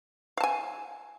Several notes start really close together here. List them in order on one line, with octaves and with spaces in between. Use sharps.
F5 A5 G#5